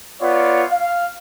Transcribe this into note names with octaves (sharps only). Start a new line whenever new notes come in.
B3 F4 C#5 D5
F5